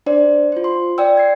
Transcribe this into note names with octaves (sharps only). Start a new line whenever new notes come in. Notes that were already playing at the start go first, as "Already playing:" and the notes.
D4 C5 D5
F4 C5
C6
D5 G5 E6
G#6 C7